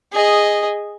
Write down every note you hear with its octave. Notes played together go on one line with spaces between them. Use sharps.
G#4 D#5